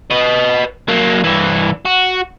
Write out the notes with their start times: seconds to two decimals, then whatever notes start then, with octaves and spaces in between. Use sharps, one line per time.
0.10 B4 D#5
0.88 F#3 A#3
1.24 G2 E3
1.86 F#4